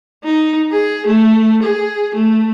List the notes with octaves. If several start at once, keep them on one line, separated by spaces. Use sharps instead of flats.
D#4
G#4
A3
G#4
A3